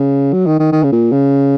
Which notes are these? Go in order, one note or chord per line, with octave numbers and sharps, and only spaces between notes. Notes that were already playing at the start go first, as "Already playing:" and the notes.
Already playing: C#3
F#3
D#3
D#3
D#3
C#3
A#2
C#3